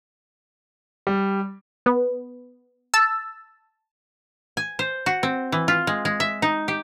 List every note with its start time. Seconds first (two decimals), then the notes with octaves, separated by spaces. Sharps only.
1.07 G3
1.86 B3
2.94 A5 E6
4.57 G#5
4.79 C5
5.06 F#4
5.23 C4
5.52 E3
5.68 F4
5.87 G#3
6.05 G#3
6.20 E5
6.42 D#4
6.68 G4